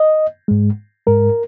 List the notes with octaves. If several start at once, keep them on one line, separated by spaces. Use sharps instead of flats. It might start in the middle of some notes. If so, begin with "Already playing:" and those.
Already playing: D#5
G#2 G#3
G#2 G#3 A#4